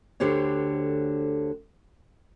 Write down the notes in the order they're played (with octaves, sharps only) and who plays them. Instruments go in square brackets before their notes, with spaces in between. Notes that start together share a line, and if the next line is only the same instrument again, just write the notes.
[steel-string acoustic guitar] D2 D3 D4 G4 C5 C#5